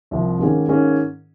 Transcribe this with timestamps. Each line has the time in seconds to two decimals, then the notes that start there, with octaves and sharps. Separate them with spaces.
0.11 C2 C3 F3 A#3
0.39 G#2 D#3 A#3 C#4 G#4
0.68 G#2 D#3 A#3 C#4 G#4